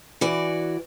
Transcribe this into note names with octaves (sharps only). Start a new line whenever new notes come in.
E3 F#4 D5